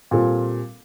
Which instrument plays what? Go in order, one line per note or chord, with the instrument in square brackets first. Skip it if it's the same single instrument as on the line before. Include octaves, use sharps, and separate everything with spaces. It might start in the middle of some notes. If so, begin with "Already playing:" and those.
[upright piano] A#2 G3 C4 F4 A4